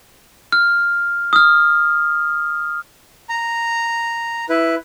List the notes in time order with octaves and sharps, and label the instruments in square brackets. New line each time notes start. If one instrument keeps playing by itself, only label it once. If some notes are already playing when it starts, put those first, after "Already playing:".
[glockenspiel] F6
D#6 F6
[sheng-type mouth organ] A#5
E4 B4